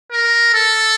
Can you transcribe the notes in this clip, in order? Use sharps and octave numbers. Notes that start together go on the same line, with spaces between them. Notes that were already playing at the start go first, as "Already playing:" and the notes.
A#4
A4